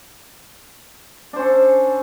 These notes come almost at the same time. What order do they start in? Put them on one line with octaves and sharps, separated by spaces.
D4 C5 C#4 A4